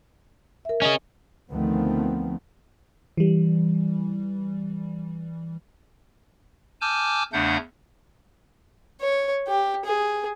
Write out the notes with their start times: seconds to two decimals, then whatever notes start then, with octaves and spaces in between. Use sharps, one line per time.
0.65 A#4 E5
0.82 C#4 G#4 D#5
1.50 D2 D#3 F3 A3 B3 C4
3.17 E3 G3
6.81 G#5 A5 D6 E6 F6 G6
7.33 E2 C#3 A3 D4 F#5 G6
9.01 C#5
9.48 G4
9.85 G#4